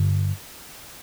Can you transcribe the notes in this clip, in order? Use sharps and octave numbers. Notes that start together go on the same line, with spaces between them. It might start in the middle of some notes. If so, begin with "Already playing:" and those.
Already playing: G2 D3